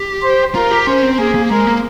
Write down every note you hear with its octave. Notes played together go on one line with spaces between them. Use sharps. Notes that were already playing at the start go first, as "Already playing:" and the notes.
Already playing: G4
C5
F4 A#4
G4
C#4 C5
C4
A#3 G#4
A#3
G#3 A#4
A#3